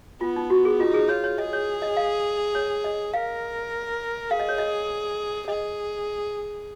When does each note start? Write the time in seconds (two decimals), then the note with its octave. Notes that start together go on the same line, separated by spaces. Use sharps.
0.21 B3 F4
0.36 D#4
0.50 F#4
0.65 G#4
0.80 D#4 F4
0.94 G#4
1.09 F4 C#5
1.24 C#5
1.38 G#4 D#5
1.53 C#5
1.82 D#5
1.97 F5
2.55 C#5
2.84 D#5
3.14 A#4 F5
4.31 G#4 F5
4.40 D#5
4.49 C#5
4.58 D#5
5.48 G#4 D#5